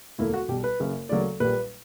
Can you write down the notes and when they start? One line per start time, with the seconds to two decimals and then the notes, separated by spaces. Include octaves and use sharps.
0.18 E1 D2 D3 A#3 E4
0.34 F#4
0.48 B1 B2 G3 G4
0.64 B4
0.80 F#1 F#2 C#3
1.09 D2 C#3 F#3 A#3 D5
1.40 A#1 A#2 G3 A#3 B4